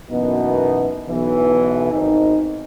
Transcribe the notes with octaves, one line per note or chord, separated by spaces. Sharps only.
F#2 B2 E3 A#3 B3 D#4
B1 B2 E3
G#1 D#4